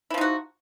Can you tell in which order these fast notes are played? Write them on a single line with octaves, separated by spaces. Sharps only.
E4 F3 D#4 F#4